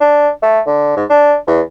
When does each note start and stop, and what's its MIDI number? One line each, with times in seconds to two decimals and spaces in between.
0.01 0.30 62
0.42 0.60 57
0.66 0.92 50
0.96 1.04 44
1.10 1.35 62
1.47 1.61 40